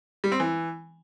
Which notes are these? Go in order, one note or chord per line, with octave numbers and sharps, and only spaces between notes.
G3
C4
E3